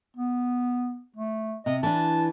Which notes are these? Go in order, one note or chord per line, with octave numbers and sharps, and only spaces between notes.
B3
A3
C3 D#5
E3 D4 A5